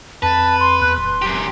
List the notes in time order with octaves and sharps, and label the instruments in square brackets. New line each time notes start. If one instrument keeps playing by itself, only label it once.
[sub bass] F2 [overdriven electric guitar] B4 [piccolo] A5
[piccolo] C6
[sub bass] E2 [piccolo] F#6
[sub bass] D1 [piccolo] C6
[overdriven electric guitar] F#2 G4